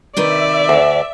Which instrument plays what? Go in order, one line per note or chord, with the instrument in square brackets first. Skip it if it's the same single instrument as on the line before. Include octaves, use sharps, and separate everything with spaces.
[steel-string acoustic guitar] C3 D#3 B4 [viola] D5 [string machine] E5
[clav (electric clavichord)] D2